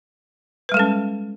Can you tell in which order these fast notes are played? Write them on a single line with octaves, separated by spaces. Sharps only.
B4 G3 G#3 A4 C#4